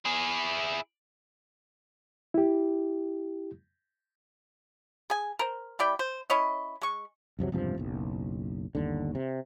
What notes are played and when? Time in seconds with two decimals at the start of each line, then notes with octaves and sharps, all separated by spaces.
0.05 E4 G#4
2.34 E4 G4
5.10 G#4 G#5
5.39 A#4 C5
5.79 G3 E4 D5 G5
5.99 C5
6.30 C#4 E4 C#5 D#5
6.82 G#3 C#6
7.39 C2 F2 C3 F#3
7.52 E1 G2 C3 F3
7.78 F#1 B1
8.75 G1 D#2 D3
9.15 C3